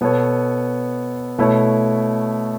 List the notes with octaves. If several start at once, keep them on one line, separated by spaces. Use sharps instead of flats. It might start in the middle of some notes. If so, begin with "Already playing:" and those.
B2 B3 A4 C#5
B2 A3 E4 C#5